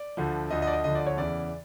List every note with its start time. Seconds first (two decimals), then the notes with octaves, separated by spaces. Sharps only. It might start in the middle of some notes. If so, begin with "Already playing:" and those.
Already playing: D5
0.17 D2 D3 F3
0.51 D2 D3 F3 D#5
0.62 D#5
0.67 D5
0.73 D#5
0.84 D2 D3 F3 D#5
0.95 D5
1.07 C#5
1.17 E2 C#3 E3 D5